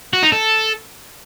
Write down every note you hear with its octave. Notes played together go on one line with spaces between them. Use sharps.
F#4
D#4
A4